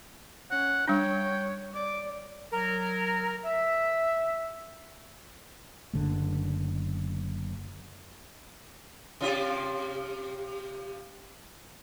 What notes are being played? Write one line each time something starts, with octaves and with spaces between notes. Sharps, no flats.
C#4 F#5
G3 D4 C#5 G5
D5 D6
F#3 A#4
E5
F#1 D3 A3
C3 F4 G4